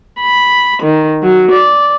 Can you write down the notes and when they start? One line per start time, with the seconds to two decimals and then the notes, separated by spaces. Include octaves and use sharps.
0.22 B5
0.83 D#3
1.23 F#3
1.52 D5